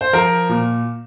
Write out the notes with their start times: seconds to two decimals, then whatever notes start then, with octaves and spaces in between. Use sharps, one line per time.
0.01 C5
0.13 F3 A#4
0.49 A#2